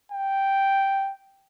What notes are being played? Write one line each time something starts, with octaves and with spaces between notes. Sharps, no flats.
G5